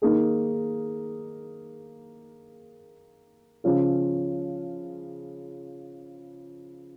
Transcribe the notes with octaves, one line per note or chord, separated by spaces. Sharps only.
D#3 A#3 D#4 G#4
C#3 F3 C#4 F4